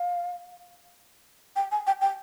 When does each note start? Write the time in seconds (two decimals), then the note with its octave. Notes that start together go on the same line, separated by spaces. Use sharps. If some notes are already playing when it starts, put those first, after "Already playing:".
Already playing: F5
1.56 G5
1.72 G#5
1.87 G5
2.01 G5